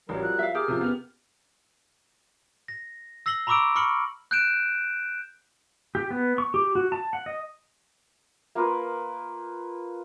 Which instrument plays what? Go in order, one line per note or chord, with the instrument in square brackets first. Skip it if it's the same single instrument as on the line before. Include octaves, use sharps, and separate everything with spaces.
[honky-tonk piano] A1 [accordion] F#3 G3 A#4 [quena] C#5
[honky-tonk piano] F3 [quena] F#6
[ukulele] E5 F5
[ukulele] G4 G#4 [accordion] A#4 [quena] F6
[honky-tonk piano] C3 F3
B3 F7
[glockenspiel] A#6
E6 A#6 C7 F#7 G7
A#5 B5 C#6 D6 E6 D7
B5 C#6 F6 C#7 F#7
F#6 G6 D7 E7
[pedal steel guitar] G4
B3
C#6
G4
F#4
A5
F#5
D#5
[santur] A#3 F4 A#4 B4